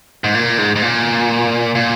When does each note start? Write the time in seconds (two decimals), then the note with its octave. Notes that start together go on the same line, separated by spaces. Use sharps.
0.24 G#2
0.35 A#2
0.58 G#2
0.76 G#2
0.82 A#2
1.75 A#2